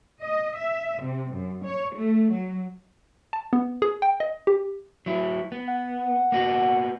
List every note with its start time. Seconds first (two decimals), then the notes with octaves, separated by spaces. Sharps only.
0.21 D#5
0.56 E5
1.00 C3
1.33 F#2
1.64 C#5
1.96 A3
2.31 F#3
3.33 A5
3.53 B3
3.82 G#4
4.02 G5
4.20 D#5
4.47 G4
5.06 F#3 E4
5.52 B3
5.68 F#5
6.32 A#3 B3 F#4